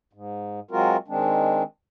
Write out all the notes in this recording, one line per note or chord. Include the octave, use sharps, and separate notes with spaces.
G#2
F#3 G#3 C4 F4 F#4 A#4
D#3 G#3 C4 D4